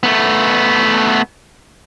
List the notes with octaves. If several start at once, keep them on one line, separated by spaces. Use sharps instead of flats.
A3 B3